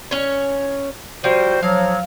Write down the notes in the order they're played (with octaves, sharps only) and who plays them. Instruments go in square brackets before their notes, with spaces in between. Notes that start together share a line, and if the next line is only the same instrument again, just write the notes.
[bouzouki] C#4 C#5
[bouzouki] F3 [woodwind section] G3 F#4 C5
[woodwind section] F3 F#3 [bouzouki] F5